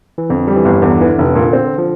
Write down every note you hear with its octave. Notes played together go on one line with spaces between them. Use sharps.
E3
F2 D3
G3
E3
G1
E2 D3
E3
F1
A#2
C4
F3